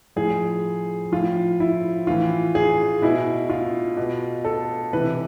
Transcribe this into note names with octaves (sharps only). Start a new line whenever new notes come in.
A2 F3 G#4
A2 F3 F4
E4
A2 E3 F4
G#4
B2 E4
F4
B2
A4
C3 E3 B4